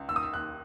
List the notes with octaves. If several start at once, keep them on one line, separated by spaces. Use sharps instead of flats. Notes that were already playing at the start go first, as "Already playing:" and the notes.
Already playing: C#2
D#2 E6
D#6
E6
D#2 F#6